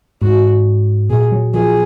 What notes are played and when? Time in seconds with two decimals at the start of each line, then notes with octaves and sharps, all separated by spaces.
0.22 G#2 F#4
1.10 A#2 G#4
1.32 F#3
1.54 F3 G#4